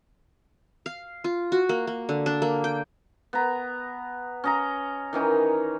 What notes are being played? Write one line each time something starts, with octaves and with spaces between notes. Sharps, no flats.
F5
F4
F#4
A#3
A#3
D3
D4
A#3
G5
B3 A#5
C#4 D#5 A#5
D#3 E3 C#4 D#4